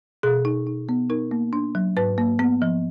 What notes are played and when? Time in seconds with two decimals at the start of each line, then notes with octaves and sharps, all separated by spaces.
0.23 B2 G#4
0.45 D#4
0.67 D#4
0.89 B3
1.10 D#4 A#4
1.31 A#3
1.53 D4
1.75 F#3
1.97 G#2 B4
2.18 A#3
2.39 B3
2.62 F3